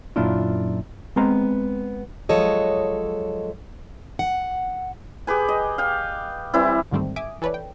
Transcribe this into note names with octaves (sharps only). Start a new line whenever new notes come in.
F#2 A#2 D4 E4 F4
G#3 B3 C4 A#5
F3 F#3 G#3 A4 C#5 D#5
F#5
G4 G#4 B4 G#5
D#5
F5 G5
E3 G3 C4 E4
D2 G#2 D#3 G3 A3 C4
E5 G#5 D6 D#6 D7
E3 A4 B4 C#5 D5
G5